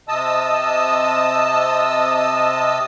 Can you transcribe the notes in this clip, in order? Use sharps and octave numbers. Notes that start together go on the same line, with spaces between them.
C3 D#5 A5 D#6 E6